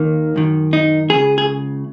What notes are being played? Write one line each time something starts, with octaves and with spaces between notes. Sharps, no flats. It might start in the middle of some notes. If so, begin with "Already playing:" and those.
Already playing: D#2 D#3 A#3
F#2 D#3
D#4
C#2 C#3 G#4
G#4